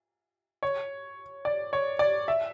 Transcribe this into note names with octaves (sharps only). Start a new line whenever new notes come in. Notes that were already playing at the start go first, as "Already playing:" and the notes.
C#5
D5
C#5
D5
E5